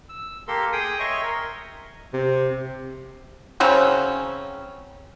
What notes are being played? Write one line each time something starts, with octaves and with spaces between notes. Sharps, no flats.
E6
A#3 G4 A4 A#4 C6
G#4 G5 D#6
C#5 D#5 E5 C6 C#6
A#4
C3
C#3 F#3 C4 C#4